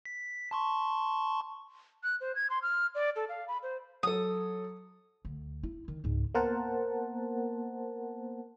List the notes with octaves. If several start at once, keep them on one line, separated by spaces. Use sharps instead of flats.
B6
A5 C6 C#6
F#6
C5
G#6
C6
F6
D5
A4
F5
B5
C5
F#3 A4 D#6
D2
E4
D#3
C#2 G#2
A#3 B3 A#4 C5 F#5 A5